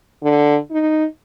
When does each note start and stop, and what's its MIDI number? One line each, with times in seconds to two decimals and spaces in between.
0.23 0.56 50
0.71 1.05 63